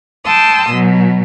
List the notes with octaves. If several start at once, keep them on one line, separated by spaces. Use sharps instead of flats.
G5 A5 C6 D#6 E6
B2 F#3